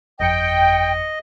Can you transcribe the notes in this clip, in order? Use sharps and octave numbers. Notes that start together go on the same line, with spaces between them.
G1 F2 D#5 G5 C#7